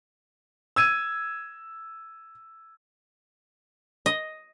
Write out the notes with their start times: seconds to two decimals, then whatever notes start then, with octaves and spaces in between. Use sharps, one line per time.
0.76 E6 G#6 D#7
4.06 D#5